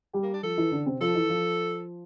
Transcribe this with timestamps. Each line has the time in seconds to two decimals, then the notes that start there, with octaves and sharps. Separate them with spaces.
0.13 G3 G4
0.23 A#3
0.33 D4
0.43 F3 F4 A4
0.58 E3 E4
0.72 D3 D4
0.86 C3 C4
1.01 F3 F4 A4
1.15 E3 E4
1.30 F3 F4